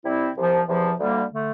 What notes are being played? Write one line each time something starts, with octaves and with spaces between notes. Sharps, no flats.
C3 G3 C4 E4
C2 C3 F3
E2 C3 F3
D2 D3 G3 A#3
D3 A3